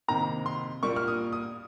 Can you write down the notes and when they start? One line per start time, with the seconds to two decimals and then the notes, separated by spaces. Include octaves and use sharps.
0.08 C3 D#3 A#3 A#5
0.46 C6
0.83 A#2 G3 A#3 C#6
0.96 F6
1.08 D#6
1.33 D#6